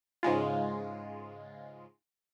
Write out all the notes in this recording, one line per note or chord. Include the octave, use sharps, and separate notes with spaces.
G#2 C#3 G#3 F4